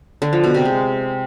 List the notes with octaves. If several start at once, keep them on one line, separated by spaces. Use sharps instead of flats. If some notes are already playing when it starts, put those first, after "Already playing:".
D3
F3
B2
C3
G#3